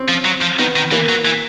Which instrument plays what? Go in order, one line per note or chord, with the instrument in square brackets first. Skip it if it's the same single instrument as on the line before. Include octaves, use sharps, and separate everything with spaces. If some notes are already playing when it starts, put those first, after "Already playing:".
Already playing: [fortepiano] C4 C#4
[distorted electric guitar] F3
F#3
F3
[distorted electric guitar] D#3 [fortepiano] B3
[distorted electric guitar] D#3
[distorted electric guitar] E3 [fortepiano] A#3
[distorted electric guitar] F#3
E3